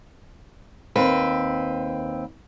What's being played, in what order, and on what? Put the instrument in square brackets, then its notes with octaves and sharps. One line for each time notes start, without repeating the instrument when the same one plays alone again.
[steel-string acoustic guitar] D#2 C4 B4